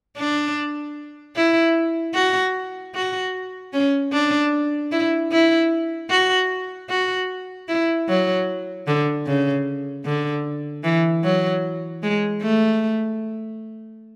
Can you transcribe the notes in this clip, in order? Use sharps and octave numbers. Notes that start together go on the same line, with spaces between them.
D4
E4
F#4
F#4
C#4
D4
E4
E4
F#4
F#4
E4
F#3
D3
C#3
D3
E3
F#3
G#3
A3